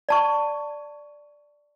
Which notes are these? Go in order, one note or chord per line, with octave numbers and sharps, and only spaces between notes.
D5 A5 C#6